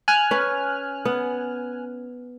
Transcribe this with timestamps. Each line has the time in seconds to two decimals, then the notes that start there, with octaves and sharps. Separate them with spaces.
0.08 G#5 F6 F#6
0.31 C#4 B4
1.05 B3